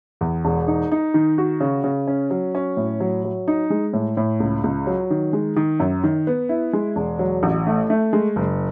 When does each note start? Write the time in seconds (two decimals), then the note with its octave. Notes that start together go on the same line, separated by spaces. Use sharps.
0.21 E2
0.45 E1
0.67 D#4
0.92 D#4
1.14 D#3
1.38 F#4
1.60 C#3
1.84 C#3
2.07 C#4
2.30 F#3
2.55 C#4
2.77 A2
3.00 F#3
3.24 F#3
3.48 D#4
3.70 G#3
3.93 A2
4.17 A2
4.40 C#2
4.64 C#2
4.87 F#3
5.10 D#3
5.33 G#3
5.56 D#3
5.80 F#2
6.04 D#3
6.27 B3
6.49 E4
6.73 G#3
6.96 E1
7.19 F#3
7.43 A1
7.67 A3
7.90 A3
8.13 G#3
8.36 F#1